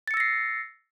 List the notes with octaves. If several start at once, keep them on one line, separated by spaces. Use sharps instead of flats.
E6 A6 A#6 C7 C#7